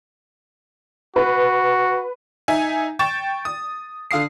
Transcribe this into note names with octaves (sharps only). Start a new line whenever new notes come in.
F#4 B4
D#4 E5 G#5
G5 C#6 A6 E7
D#6
D3 F5 D#6 C7